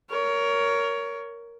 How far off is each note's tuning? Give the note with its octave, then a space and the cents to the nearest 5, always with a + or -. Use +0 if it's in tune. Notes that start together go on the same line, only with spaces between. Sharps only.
A#4 +0 C#5 +20